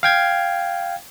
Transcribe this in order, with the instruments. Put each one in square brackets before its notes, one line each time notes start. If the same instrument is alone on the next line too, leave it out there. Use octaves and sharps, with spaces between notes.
[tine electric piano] F5 G5 G#6